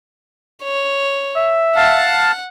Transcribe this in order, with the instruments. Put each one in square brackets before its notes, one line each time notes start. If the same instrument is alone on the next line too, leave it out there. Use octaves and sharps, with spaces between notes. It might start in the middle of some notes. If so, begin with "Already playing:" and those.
[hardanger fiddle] C#5
[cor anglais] E5
[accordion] F5 A5 [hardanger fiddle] F#5